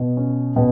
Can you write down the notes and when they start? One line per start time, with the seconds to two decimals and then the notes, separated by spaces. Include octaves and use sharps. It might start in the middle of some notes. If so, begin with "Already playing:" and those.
Already playing: B2
0.17 C#4
0.56 B2